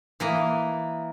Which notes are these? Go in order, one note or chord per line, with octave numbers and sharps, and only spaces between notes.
E3 A#3 D#5